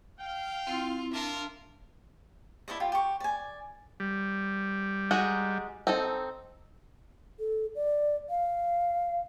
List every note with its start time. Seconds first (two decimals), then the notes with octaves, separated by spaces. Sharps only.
0.19 F5 G5
0.67 C4 E4 F4
1.13 D4 F4 A#4 E5 A5
2.68 E4 A4 D5 D#5
2.80 F4 G4
2.92 G4 C#6
3.20 D5 G#5
4.00 G3
5.11 G#3 D#4 F#4
5.87 C4 D#4 A4
7.39 A4
7.75 D5
8.30 F5